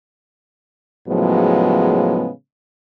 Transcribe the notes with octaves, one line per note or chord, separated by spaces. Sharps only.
A2 C#3 F3 F#3 G#3 B3